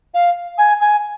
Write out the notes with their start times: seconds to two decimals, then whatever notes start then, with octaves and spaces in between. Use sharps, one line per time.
0.14 F5
0.58 G#5
0.81 G#5